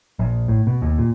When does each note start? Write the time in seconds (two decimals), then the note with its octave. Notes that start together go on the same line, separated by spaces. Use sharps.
0.19 A#1
0.48 A2
0.67 B2
0.82 D#2
0.98 A#2